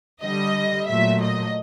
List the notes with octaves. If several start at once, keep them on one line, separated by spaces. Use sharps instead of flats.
D3 G3 D#5
A#2 F#3 A3 E5
D#5